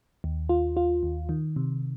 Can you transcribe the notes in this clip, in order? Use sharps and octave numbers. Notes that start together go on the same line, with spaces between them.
D#2
F4
F4
D#2
D#3
C3